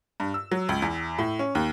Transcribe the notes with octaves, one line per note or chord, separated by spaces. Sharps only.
G2
E6
F#3
C#2
E2
A2
C#4
D#2